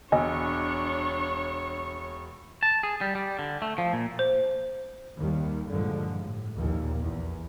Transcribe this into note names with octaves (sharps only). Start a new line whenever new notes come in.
E1 D4 C#5 D#5 G#5 C#6
A5
G#4
G3
G3
D3
A3
F3
A#2
C5
D#2 D#3 G3
G2 A#2 D3 F3 G#3
A2
A#1 D#2 A#2 A#3
E2